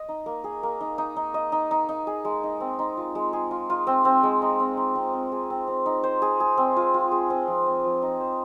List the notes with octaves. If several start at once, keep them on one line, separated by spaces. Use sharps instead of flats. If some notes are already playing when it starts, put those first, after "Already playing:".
Already playing: D#5
D#4
A#3
G#4
A#3
D#4
D#4
D#4
D#5
D#4
D#4
D#4
G#4
G#3
D#4
C4
D#4
F4
G#3
G#4
F4
F4
C4
C4
G#3
D#4
C4
D#4
C4
C4
G#4
C4
C4
D#4
C5
G#4
G#4
C4
F4
F4
G#4
C4
F3
C4
F3
D#4
C5